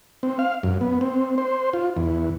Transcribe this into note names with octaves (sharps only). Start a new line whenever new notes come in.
C4
F5
F#2
B3
C4
C5
F4
E2